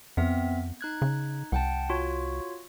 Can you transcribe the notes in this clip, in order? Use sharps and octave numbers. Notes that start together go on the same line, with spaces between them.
F2 B3 C4 E5
D#4 F#6 G#6
C#3
C2 F#5 G5 A5
F4 F#4 C#5